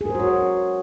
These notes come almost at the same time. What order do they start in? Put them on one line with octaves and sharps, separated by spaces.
G#4 A#4 C5 F#4 C#5